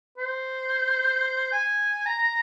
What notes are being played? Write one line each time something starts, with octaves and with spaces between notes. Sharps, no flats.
C5
G#5
A#5